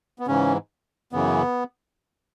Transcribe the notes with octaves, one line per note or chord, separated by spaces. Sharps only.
B3
G#2 C#3 E3 C#4
F#2 C#3 E3 B3